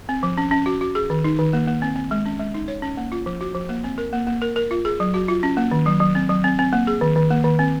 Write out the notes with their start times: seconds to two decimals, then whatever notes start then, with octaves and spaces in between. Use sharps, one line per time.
0.09 C4
0.23 F3
0.38 C#4
0.51 C#4
0.66 F#4
0.81 F#4
0.95 G#4
1.10 D#3
1.24 D#4
1.39 D#3
1.53 A#3
1.67 A#3
1.82 C4
1.96 C4
2.11 G#3
2.26 C#4
2.40 G#3
2.54 D#4
2.68 C#5
2.82 C#4
2.97 A#3
3.12 F4
3.26 F3
3.41 F#4
3.55 F3
3.69 A#3
3.84 C4
3.98 A#4
4.13 A#3
4.27 A#3
4.42 A#4
4.56 A#4
4.71 F4
4.85 G#4
5.00 F#3
5.14 F#4
5.28 F4
5.43 C#4
5.57 A#3
5.71 D#3
5.86 F#3
6.00 F#3
6.15 C4
6.29 F#3
6.44 C4
6.59 C4
6.73 A#3
6.87 G#4
7.01 D#3
7.16 D#3
7.30 A#3
7.44 D#3
7.59 C4